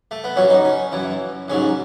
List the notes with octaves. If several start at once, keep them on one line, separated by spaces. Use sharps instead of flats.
A3
B3
A1 A2 F#3 C#4
D#4
C#4
F#2 E3
A1 G#2 F#3 C#4